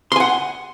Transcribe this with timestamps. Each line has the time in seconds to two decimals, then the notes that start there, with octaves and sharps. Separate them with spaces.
0.12 C6
0.16 G#5
0.20 F#5